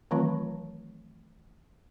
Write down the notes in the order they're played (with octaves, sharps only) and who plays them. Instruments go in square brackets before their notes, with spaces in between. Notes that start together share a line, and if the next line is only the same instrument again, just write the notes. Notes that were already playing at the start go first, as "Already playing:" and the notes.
[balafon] D#3 E3 F#3 A3 C4 F4